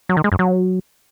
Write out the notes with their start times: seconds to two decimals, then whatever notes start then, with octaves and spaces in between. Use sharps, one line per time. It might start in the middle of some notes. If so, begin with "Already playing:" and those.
0.09 F#3
0.17 D#3
0.24 G#3
0.32 F#2
0.39 F#3